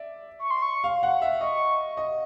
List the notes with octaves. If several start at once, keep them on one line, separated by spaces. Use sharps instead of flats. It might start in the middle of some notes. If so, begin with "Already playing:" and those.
Already playing: D5 E5
C#6
C6
C#6
F5
F#5
E5
D#5 C#6
D#5